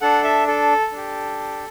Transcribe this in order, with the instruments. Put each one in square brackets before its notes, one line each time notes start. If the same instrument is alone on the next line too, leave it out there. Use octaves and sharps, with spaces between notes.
[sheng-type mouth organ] D4 A4 F#5
E5
A4
D4 G4